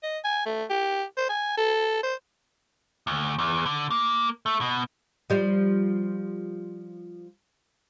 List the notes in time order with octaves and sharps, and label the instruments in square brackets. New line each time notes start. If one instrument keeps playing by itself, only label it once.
[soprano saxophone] D#5
G#5
A3
G4
C5
G#5
A4
C5
[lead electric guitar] D2
E2
D3
A#3
A3
B2
[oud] F3 G3